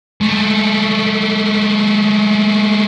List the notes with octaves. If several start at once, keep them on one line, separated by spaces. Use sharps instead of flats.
G#3 A3